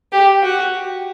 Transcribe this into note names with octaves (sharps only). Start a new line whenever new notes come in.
G4
F#4